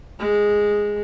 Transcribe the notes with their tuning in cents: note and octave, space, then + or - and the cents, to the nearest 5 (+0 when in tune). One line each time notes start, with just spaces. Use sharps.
G#3 -5